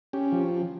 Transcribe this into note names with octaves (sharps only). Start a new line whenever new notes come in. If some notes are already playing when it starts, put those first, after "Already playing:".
C#4 G4
F3